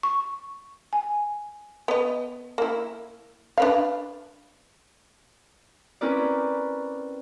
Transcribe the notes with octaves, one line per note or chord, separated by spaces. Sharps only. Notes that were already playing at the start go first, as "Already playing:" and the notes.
C#6
G#5
B3 D#5
A#3 E4
D4 B4 F5
C4 C#4 E4 A#4 B4 D5